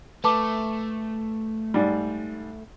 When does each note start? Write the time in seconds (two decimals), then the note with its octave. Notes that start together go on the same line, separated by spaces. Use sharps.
0.24 A3 B4 A5 D6
1.74 G#2 G3